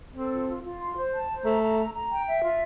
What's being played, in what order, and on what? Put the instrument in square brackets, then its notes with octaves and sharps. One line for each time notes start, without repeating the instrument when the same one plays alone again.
[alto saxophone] C4 [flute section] A4
[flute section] F4
F4
F4
C6
C5
A5
C5
[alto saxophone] A3 [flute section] A#5
[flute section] A#5
A#5
A#5
G5
E5
F4